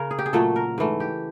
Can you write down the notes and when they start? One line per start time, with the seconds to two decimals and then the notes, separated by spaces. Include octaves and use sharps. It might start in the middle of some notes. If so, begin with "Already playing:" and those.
Already playing: C#3 A#4
0.11 G#4
0.19 G4
0.26 G#4
0.33 A#2 F#3 A3 A4
0.56 A#4
0.78 G#2 E3 A3
1.00 G4